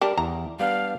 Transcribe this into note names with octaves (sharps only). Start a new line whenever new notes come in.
G3 D4 A#4
E2 A#5
G3 B3 D4 F5